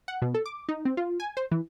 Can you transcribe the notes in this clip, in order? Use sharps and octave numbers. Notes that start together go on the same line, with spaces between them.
F#5
B2
A4
D6
D#4
C4
F4
G#5
C5
E3